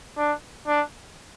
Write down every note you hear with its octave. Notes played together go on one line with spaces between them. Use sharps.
D4
D4